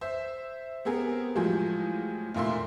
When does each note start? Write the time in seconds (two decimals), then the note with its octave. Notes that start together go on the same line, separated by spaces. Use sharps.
0.01 C5 E5
0.85 B3 C4 G4 G#4 A#4
1.35 A2 F3 F#3 G#3 G4 G#4
2.34 F1 A#2 A#3 E5 C6